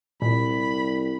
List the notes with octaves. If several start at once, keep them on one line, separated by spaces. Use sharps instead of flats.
C2 A#2 B5